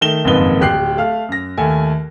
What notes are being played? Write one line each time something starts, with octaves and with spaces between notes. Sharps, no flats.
D#3 A3 E7 G7
F#1 F2 G#2 D#3 B4 G7
D1 G4 F#6 C7
A3 F5 F6
F#2 A#6
D#2 A3 G#5